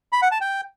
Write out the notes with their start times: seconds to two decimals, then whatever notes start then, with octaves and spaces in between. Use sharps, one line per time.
0.13 B5
0.22 F#5
0.31 A5
0.41 G5